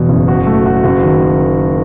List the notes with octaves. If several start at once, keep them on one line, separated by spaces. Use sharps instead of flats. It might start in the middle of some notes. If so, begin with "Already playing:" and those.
Already playing: E2 B2
F#1
F#4
A3
F#4
F#1
D#3